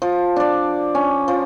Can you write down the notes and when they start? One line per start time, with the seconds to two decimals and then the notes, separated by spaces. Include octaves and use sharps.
0.02 F3
0.36 D4 D5
0.95 C#4
1.28 F3